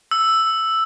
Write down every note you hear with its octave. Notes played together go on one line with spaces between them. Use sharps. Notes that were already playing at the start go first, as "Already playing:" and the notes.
E6